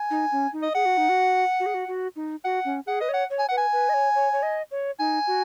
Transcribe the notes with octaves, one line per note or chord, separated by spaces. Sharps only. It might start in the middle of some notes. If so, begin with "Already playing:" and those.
Already playing: G#5
D#4
C#4
D#4
D#5
G#4 F#5
F#4
D#4
F#4
F#4
G#4
F#4
F#4
D#4
F#4 F#5
C#4
G#4 F#5
B4 D#5
C#5 F#5
C#5
G#5
B4 F#5
G#5
B4
D#5
C#5
C#5
C#5
D#5
C#5
D#4 G#5
F#4